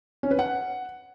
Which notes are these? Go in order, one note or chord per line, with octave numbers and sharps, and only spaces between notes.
C#4
B4
F#5